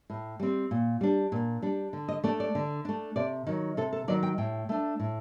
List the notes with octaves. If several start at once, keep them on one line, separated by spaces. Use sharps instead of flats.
A2
G3 C4
A#2
G3 D4
A#2
G3 D4
D3
D#5
A3 D4 D5
D5
D3
A3 D4
C3 D5
D#3 F#3
C3 A4
A4
D#3 F#3 D5
G5
A2 G5
A3 D4
A2